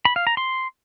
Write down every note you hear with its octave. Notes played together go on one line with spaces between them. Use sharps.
B5
F5
A#5
C6